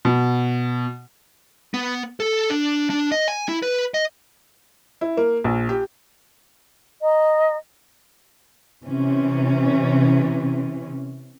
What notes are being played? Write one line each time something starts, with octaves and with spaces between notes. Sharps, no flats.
B2
B3
A4
D4
D4
D#5
G#5
E4
B4
D#5
E4
A#3
A#1
G4
D#5 A#5
C3 E3 C#4